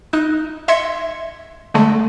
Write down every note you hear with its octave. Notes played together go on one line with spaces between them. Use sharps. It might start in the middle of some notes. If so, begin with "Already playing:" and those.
D#4 F#6
D#5 E5 C6 G#6 C#7
D3 G#3 A3